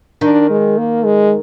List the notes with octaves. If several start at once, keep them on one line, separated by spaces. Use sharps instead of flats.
D#3 D4
G#3
A#3
G#3